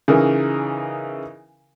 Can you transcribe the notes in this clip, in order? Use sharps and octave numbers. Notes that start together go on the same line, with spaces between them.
C#3 E3 D#4 A#4